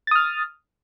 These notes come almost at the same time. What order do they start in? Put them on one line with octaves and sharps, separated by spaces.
A6 D#6 F6